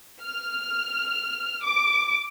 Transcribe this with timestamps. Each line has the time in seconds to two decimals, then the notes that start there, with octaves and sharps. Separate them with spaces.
0.22 F6
1.63 D6